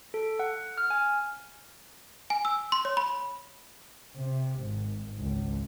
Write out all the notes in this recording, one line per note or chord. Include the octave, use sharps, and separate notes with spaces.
A4
F#5
F6
G#5
G#5
E6
C6
C#5
B5
C3
G#1
G#1 C#2